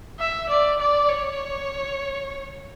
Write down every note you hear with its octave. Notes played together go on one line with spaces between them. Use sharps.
E5
D5
D5
C#5